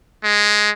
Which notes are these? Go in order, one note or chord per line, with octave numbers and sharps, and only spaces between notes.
G#3